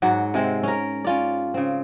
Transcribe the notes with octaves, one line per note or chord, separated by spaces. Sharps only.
G#2 F#3 F#5
C3 G#3 C4
C#4 A#4
C#4 F4 D5
C#3 C4